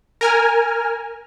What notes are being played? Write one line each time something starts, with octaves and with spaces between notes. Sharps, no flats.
A#4 G#5 F6